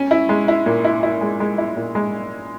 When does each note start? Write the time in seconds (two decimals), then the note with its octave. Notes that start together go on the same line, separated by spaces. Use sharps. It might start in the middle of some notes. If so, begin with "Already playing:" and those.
Already playing: C#4
0.11 E4
0.29 G#3
0.48 E4
0.66 A#2
0.85 E4
1.03 E4
1.21 G#3
1.40 G#3
1.58 E4
1.77 A#2
1.95 G#3